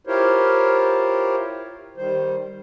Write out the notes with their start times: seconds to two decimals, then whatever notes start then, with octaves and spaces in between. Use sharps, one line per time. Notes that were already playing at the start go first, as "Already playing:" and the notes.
0.07 E4 F4 G4 A#4 C5 C#5
1.97 D#3 G3 C5